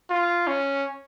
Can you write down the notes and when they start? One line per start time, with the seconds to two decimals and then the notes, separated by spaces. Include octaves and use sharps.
0.10 F4
0.47 C#4